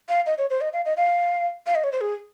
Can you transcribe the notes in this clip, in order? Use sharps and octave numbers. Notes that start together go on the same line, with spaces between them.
F5
D#5
C#5
C5
D#5
F5
D#5
F5
F5
D#5
C#5
C5
G#4